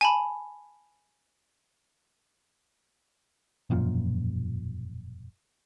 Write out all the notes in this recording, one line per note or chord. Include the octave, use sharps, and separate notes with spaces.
G#5 A5 B5
E1 F#2 A#2 F3